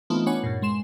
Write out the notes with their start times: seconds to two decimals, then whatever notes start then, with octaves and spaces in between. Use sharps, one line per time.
0.10 E3 A3 B3 C4 D#4 F4
0.26 B3 C#4 D4 C#5 F#5 G#5
0.43 G2 A#2
0.62 G#3 C6 E7